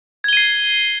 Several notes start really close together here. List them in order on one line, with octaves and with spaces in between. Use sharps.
G#6 G7 D#7 C7